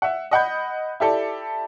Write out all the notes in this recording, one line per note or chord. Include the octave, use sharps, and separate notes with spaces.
E5 F#5
D#5 F#5 B5 G6
E4 G4 A4 D5